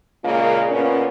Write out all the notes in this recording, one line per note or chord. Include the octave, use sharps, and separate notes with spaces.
A#2 C#3 G#3 A#3 F4
A#2 B3 C#4